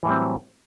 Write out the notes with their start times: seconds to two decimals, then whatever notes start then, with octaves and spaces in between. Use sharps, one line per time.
0.03 E3
0.05 A2
0.08 G3
0.11 C4
0.13 F#3